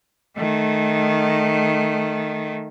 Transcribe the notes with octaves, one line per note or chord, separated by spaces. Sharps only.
D#3 A3